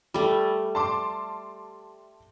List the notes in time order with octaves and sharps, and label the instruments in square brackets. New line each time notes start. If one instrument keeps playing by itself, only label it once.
[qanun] G3 A3 [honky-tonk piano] B5
[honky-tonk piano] A5 C6 D6